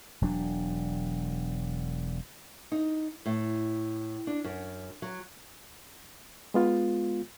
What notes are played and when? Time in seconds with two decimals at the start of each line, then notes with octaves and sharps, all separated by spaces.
0.22 E1 F#3 D4
2.72 D#4
3.26 A2
4.27 D4
4.44 F#2
5.02 F#3
6.54 G#3 B3 F4